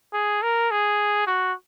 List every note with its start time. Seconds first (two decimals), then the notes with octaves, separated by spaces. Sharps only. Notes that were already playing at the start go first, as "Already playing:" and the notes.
0.13 G#4
0.42 A#4
0.71 G#4
1.27 F#4